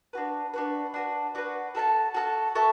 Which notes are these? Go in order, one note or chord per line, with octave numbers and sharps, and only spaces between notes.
D4 F#4 B4
D4 F#4 B4
D4 F#4 B4
D4 F#4 B4
F#4 A4 E5 A5
F#4 A4 E5 A5
F#4 A4 E5 A5